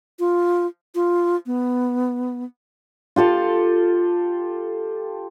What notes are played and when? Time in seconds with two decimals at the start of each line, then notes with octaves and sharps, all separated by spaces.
0.19 F4
0.95 F4
1.46 B3
3.16 F4 G4 A4 F5